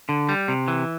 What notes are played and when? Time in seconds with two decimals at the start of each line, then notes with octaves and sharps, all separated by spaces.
0.09 D3
0.29 G3
0.48 C3
0.68 E3